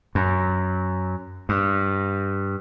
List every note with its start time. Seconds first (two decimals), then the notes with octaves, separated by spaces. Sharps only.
0.15 F#2
1.49 G2